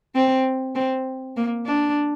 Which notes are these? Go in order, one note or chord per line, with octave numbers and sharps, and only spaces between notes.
C4
C4
A#3
D4